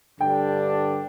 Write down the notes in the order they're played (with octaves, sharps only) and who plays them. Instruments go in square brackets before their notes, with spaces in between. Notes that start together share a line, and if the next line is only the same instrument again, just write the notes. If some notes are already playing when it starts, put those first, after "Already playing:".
[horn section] G2 D3 G3 D4 [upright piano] G5